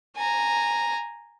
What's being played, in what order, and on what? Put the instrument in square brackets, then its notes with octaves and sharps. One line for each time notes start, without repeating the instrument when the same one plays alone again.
[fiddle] G#5 A#5